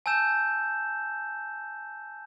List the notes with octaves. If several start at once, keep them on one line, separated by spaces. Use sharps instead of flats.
G#5 A5 E6 G6 E7